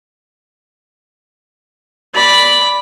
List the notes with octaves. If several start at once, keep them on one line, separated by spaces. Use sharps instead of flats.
D5 B5